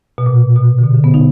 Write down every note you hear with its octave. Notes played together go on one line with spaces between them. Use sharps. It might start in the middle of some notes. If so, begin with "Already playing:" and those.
B2
A#2
B2
D3
B2
D3
B3
D#4